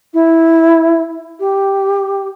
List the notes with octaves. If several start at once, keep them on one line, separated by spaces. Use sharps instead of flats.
E4
G4